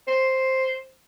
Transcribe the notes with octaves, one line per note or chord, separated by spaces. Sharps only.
C5